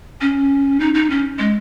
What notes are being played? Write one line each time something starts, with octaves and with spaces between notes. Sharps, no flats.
C#4
D#4
D#4
C#4
G#3